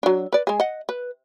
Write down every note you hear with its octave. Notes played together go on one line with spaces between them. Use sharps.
F#3 D4
B4 D5
G#3 G#4
D#5 F#5
B4